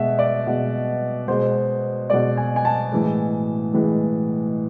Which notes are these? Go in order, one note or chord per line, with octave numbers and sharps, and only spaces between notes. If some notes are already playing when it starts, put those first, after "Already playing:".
Already playing: B2 G#3 E5
D5
B2 G#3
B2 G#3 C5
B2 G#3 D5
G#5
G#5
A5
A2 E3 G#3
A2 E3 G#3